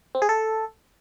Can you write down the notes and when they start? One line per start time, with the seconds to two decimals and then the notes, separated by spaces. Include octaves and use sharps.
0.15 C4
0.22 G#4
0.29 A4